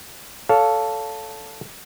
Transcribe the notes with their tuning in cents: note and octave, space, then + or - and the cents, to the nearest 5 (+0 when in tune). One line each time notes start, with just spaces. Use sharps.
A4 +0 C#5 +35 F5 +0